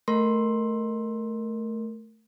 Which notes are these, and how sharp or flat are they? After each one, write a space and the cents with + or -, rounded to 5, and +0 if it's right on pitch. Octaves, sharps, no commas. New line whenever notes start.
A3 +0 A#4 +0 C6 +15